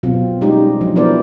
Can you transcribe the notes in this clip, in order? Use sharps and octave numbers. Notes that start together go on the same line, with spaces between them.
B2 F#3 C4 F4
G3 G#3 C#4 D#4 G4
F3 F#3 D4
F3 B3 E4 A#4 C5 D5